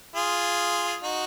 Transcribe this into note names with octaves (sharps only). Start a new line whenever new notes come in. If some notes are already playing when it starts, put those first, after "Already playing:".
F4 G#4
D#4 F#4